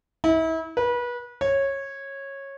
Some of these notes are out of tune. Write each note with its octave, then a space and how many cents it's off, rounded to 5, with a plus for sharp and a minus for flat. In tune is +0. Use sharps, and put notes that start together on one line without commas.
E4 -35
B4 -30
C#5 -15